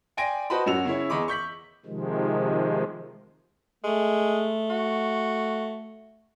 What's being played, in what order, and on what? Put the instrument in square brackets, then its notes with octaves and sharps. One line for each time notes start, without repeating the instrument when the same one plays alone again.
[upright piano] D5 G5 G#5 C6 A#6 D7
F#4 B4 C5 D#5 A5 B5
F#2 C#4 F#4 F#5 E6 F7
C#3 E4 C#5
E2 G#4 D#5 B5 C#6 D6
C#6 G6 B6 F#7
[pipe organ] C3 D#3 F3 G#3
[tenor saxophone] G#3 [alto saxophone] A3
[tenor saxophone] F#4